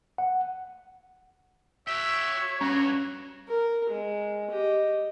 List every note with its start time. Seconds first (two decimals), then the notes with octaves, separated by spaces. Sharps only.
0.18 F#5
1.87 F#4 C#5 E5 G5
2.61 G2 C#4 F#4
3.48 A#4
3.89 G#3
4.51 G4 D#5